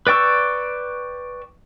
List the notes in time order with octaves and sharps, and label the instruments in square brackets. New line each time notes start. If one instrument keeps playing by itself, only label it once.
[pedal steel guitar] B4 D5 G5 C#6 E6